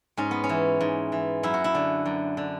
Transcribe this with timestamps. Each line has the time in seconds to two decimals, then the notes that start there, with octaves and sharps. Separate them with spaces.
0.17 G#2 C#4
0.31 B3
0.44 C#4
0.49 E3
0.81 G#2
1.12 E3
1.43 F#2 E4
1.54 F#4
1.64 E4
1.75 D3
2.06 F#2
2.37 D3